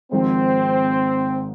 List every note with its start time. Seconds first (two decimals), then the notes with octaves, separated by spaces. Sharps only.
0.12 G#1 G#2 F3 C4